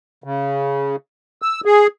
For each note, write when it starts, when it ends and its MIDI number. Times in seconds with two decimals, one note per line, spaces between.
0.24 0.96 49
1.42 1.61 88
1.65 1.87 68